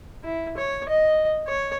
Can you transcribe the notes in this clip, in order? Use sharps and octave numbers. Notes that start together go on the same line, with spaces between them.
E4
C#5
D#5
C#5